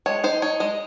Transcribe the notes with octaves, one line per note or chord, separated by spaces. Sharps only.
G#3 C#5
D#4 C5
D#4 C#5
G#3 D#5